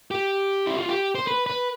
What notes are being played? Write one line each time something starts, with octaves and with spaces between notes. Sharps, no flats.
G4
E4
F4
G4
C5
B4
B4